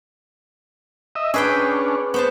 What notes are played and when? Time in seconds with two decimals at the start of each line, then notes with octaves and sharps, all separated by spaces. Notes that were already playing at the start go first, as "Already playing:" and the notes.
1.15 D#5 E5
1.34 C#4 D4 G#4 B4 G5
2.14 B3 C5 A5